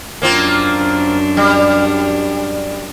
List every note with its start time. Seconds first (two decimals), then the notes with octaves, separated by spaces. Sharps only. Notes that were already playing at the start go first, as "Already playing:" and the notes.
0.22 F#2 A#3 C4 D4 F4
1.37 G3